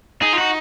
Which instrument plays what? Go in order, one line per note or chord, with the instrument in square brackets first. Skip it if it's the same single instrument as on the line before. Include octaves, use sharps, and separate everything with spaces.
[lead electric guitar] D#4 [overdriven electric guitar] G#4
[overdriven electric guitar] F4
F#4